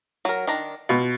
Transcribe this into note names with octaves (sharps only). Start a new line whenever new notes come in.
F#3 A#4
D#3 D4 A#5
B2 F4